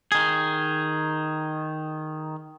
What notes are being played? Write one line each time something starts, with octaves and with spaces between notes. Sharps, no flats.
D#3 G#4